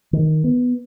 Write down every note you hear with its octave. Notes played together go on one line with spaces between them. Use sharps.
D#3
B3